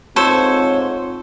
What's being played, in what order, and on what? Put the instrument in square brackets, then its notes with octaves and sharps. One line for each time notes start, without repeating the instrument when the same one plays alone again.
[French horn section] G#2 C4 F4 [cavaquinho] A4 C5 C#5